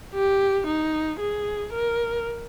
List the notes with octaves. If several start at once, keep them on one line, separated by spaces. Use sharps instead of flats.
G4
D#4
G#4
A#4